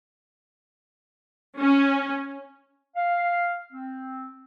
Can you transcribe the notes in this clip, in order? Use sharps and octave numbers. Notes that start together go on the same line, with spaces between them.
C#4
F5
C4